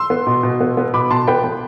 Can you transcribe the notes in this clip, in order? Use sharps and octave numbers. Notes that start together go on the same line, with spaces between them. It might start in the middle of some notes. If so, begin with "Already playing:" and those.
Already playing: C6 E6
B3
B2
B2
B3
B3
B2 B5 D6
B2 A5 C6
B3 G5 B5
B3